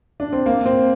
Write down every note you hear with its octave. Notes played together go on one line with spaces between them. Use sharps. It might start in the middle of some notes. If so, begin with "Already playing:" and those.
D4
C4
A#3
C4